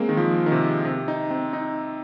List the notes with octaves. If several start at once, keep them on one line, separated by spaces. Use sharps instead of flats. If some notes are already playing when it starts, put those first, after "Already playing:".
Already playing: G#3 A#3 C4
D#3
F3
D#3
C3
C3
D#4
C4
D#4